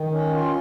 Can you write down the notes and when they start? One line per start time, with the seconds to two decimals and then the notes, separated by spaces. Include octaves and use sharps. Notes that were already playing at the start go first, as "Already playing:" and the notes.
Already playing: D#3
0.12 C#4
0.34 F4